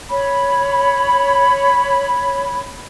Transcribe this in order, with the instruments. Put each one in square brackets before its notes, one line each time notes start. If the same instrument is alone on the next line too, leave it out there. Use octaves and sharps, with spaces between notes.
[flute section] C#5 B5